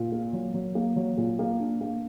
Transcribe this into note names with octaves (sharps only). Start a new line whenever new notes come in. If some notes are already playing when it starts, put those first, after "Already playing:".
Already playing: A#2
A#3
F#3
F#3
A#3
F#3
A#2
A#3
D4
A#3